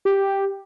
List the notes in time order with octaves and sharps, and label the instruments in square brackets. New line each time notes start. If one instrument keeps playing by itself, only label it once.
[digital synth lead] G4